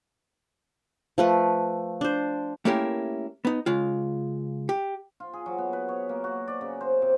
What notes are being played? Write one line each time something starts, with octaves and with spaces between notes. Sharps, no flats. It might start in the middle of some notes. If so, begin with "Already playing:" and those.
F3 A3 B4
D4 C5
A3 A#3 C#4 E4 G4 A#4
B3 D#4
C#3 G#3 F4
G4
F4
G#4
F#3
B3
B4
C#5
A#3
F#4
D5
C#3
C5
C3